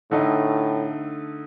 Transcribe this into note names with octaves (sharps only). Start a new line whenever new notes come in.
A2 D3 A3 D#4